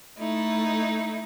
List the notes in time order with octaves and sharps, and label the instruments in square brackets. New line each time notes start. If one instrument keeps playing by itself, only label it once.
[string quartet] A3 D#4 E4